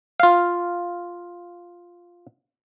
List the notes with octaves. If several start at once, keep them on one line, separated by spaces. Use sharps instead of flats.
F4 F5